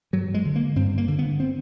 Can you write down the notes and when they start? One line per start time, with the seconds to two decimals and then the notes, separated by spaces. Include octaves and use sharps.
0.13 G2 F#3
0.34 G#3
0.45 D3
0.56 A#3
0.76 G2 C4
0.98 A#3
1.08 D3
1.19 B3
1.40 C4